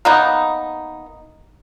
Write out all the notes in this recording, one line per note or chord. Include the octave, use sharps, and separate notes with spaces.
A#3 B3 D#4